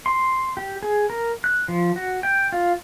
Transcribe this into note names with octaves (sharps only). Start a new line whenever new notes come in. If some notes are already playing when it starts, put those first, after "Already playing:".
C6
G4
G#4
A#4
F#6
F3
F#4
G5
F4